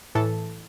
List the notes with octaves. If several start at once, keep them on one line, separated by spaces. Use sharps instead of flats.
A2 E3 A4